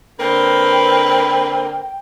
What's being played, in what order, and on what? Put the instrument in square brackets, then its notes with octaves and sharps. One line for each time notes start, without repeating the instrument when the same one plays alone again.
[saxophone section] D3 A#3 C4 [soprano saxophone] B4 [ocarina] G5